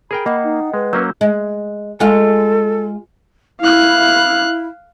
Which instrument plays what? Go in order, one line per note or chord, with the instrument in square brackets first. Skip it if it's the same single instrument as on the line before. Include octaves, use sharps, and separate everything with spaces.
[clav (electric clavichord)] G#4 A#4 G5 [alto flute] B5
[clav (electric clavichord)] A#3 [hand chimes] D#5 F#5 G5
[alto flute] D#4
[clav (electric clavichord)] G#3 [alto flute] B4
[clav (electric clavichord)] F#3 A#3 C#4 [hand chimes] F#4 E6 G6
[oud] G#3
[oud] G#3 F4 F5 [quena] A4
[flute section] E4 [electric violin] F5 F#6